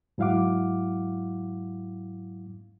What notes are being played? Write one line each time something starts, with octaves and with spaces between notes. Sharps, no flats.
G#2 F#3 E4 F5 F#5 D6